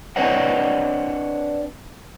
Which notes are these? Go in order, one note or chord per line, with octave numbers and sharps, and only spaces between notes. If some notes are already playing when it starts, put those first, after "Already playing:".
C4 D4 B4 C#5 D#5 F#5